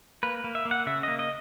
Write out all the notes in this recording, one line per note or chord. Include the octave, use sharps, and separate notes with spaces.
A#3 B4
A#3
E5
A#3
F#5
C#3 E5
A#3 D#5
D#5